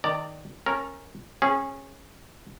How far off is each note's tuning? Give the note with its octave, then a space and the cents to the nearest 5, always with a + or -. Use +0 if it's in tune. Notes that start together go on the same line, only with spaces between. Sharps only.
D#3 +0 D5 +0 A#5 -45
C#4 -15 A#4 +0 A5 -35
C#4 -20 G#4 +0